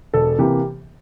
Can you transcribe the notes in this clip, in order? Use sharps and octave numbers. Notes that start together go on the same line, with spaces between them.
E1 A4
C3 E3 A#3 G4